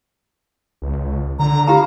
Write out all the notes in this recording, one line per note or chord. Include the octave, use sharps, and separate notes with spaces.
C#2
D3 A#5
F4 G4 F5 A#5